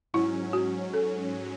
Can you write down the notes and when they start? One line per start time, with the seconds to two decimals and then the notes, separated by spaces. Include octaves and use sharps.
0.14 G#2 F#3 C#4 E4
0.53 F#4
0.93 A4